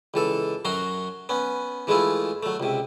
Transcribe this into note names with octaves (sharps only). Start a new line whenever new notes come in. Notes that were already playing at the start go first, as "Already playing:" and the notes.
C#2 E3 A4
F#2 F#3 F#4 A#5 C6
B3 C#4
E3 G#3 A3 E4 F4
F#3 A3
C#2 C3